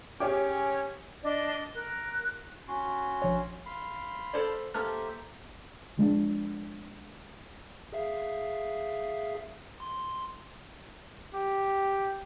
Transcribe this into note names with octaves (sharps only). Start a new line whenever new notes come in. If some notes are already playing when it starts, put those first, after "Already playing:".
C#4 G4 G#4 C#5 G5
D4 D5 D#5
A#4 F#6
C#4 F#4 C6
A#1 C#5
F5 B5 C6
A4 C5 D5
A#3 G4 A4 C5 E5 A5 F6 A6
F3 G#3 B3 D4
G#4 E5 F5
C6
G4